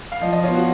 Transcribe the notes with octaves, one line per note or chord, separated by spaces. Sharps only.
F5
F3 D#5
D#5
B3 F4 C#5
F#4